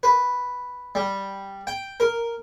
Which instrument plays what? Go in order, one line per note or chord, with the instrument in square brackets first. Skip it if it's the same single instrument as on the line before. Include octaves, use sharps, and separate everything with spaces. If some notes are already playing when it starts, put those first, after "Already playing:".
[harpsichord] B4
G3
G5
A#4